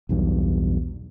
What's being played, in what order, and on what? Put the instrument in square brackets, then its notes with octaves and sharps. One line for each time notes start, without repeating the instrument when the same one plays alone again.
[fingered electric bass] B1 E2 G2